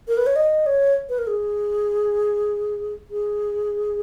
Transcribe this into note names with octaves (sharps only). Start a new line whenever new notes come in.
A#4
B4
C#5
D#5
C#5
B4
A#4
G#4
G#4